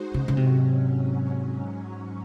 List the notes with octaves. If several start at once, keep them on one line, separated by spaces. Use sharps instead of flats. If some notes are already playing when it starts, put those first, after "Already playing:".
Already playing: G#3 D#4 F#4 C5
C#3
C#3
G#2 C3 F#3 C#4